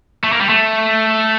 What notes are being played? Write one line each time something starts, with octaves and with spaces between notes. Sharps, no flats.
A3
A#3
G3
A3